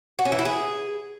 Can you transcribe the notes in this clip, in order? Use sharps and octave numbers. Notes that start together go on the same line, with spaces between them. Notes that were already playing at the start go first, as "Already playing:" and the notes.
F#4
C#4
E3
E4
G#4